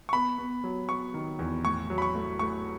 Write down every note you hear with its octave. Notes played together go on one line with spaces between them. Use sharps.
C#6
B3 B5
B3
F#3
B3 C#6
D#3
E2
A2 C#6
F#3
B5
C#6
A3
A3 C#6